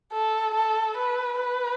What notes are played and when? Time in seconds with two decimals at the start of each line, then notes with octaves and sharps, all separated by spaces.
0.12 A4
0.54 A4
0.97 B4
1.40 B4